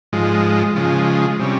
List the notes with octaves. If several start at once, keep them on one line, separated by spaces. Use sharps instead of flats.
G#2 F3 G#3
C#3 F3 G#3
C3 G3 C#4